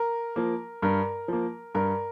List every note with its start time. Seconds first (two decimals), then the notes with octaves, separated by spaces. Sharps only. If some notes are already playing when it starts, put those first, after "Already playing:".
Already playing: A#4
0.36 F3 A#3
0.82 G2 A#4
1.28 F3 A#3
1.75 G2 A#4